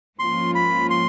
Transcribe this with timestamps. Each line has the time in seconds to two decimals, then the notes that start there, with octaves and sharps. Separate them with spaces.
0.19 G#2 F3 A#3 C#4 F4 C6
0.55 B5
0.90 C6